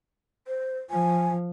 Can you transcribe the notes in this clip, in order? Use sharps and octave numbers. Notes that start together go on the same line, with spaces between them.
C5
F3 G#5